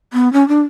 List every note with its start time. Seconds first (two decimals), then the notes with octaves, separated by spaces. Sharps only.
0.13 B3
0.33 C#4
0.48 D4